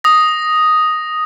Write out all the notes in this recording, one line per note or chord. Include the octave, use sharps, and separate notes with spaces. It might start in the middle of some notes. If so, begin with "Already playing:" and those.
D#6 A#6